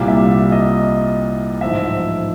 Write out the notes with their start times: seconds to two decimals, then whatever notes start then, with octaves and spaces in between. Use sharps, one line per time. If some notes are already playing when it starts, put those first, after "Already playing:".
Already playing: C2 A#2 G3 F5
0.08 E5
0.52 D#5
1.61 A1 G#2 F3 E5